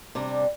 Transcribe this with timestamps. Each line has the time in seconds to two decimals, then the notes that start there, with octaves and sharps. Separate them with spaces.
0.15 C3 G3 D4